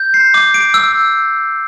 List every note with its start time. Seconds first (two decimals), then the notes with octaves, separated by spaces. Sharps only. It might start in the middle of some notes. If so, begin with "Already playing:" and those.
Already playing: G6
0.14 C7
0.34 D6
0.54 D7
0.74 E6